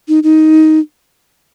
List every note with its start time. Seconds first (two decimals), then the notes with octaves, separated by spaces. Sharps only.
0.08 D#4
0.23 D#4